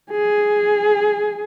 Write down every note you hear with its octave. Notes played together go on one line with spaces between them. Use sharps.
G#4